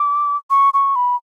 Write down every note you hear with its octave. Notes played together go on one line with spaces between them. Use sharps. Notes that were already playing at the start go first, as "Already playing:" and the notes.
Already playing: D6
C#6
C#6
B5